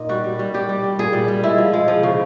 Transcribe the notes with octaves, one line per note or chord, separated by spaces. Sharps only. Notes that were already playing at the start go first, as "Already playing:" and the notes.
Already playing: A#2 D#4
G3 F#4
G3
G3
G3 G4
G3
G3
A#2 G#4
G3
G3
G#3 E4
F3
G#3
F3
C#3